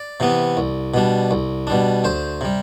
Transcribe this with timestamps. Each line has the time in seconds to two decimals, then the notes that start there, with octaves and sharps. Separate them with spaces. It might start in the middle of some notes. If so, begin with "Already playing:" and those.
Already playing: D5
0.20 C3 E3 B3
0.57 C2
0.94 B2 G3 D4
1.31 C2
1.67 B2 G3 D4
2.04 D2 C5
2.41 C3 G3